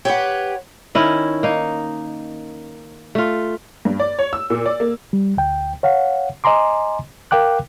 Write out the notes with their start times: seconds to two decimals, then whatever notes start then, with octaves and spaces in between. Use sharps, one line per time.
0.05 G4 G#4 B4 C#5 F#5
0.95 D#3 C#4 E4 D#5
1.43 A#3 D#4
3.15 A3 F4
3.85 G2
4.00 D5
4.19 C#5
4.33 E6
4.50 A#2
4.66 D5
4.80 A#3
5.13 G3
5.37 D2 G5
5.83 C#5 F5 F#5
6.44 D#5 G#5 A#5 C6 D6
7.31 A#4 F5 G5 D6 F#6